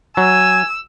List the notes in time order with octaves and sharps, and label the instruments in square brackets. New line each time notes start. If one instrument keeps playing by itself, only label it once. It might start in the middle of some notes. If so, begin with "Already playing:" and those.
[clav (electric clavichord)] F#3 [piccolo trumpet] G#5 [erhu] E6